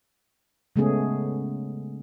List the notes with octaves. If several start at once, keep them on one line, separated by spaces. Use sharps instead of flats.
C#3 G#3 A3 B3 C#4 G#4